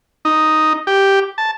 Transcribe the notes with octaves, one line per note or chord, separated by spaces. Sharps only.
D#4
G4
A5